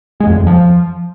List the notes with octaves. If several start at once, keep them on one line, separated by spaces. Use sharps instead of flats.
G#3
F2
E2
F2
F3